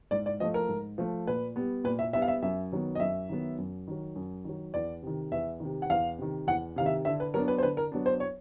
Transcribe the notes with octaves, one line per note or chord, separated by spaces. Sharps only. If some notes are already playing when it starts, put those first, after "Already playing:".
G#2 D5
D5
F3 A3 D#5
A#4
G#2
F3 A3
A#2 B4
G3 B3
A#2 B4
E5
G3 B3 E5
F5
E5
F#2 E5
D#3 F#3 B3
D#5
F#2 E5
D#3 F#3 B3
F#2
D#3 F#3
F#2
D#3 F#3
E2 D5
C3 D#3
E2 E5
C3 D#3
F#5
E2 F5
C3 D#3
E2 F#5
C3 D#3 F5
E5
D3 E5
B4
F#3 B3 D4 A#4
B4
C5
D3 B4
A#4
F#3 B3 D4
C5
C#5